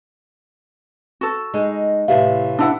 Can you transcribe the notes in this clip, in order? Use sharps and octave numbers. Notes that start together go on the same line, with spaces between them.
F#4 A4
G#3 D#4
A2 C3 E3 G4 E5 F5
D4 E4 F#5